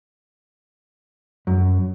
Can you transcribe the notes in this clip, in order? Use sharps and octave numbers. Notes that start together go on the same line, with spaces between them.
F#2